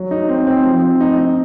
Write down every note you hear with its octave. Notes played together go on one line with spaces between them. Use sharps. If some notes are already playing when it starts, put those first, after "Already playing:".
Already playing: F#3
D#4
C4
C4
F3
C4
D#4
D#4